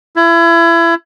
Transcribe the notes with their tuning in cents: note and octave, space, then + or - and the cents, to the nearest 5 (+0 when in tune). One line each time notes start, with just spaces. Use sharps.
E4 +30